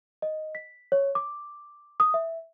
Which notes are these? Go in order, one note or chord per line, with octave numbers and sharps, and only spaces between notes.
D#5
B6
C#5
D6
D#6
E5